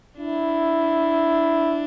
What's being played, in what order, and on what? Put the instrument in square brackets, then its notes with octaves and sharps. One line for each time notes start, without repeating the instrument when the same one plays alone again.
[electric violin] D4 [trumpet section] E4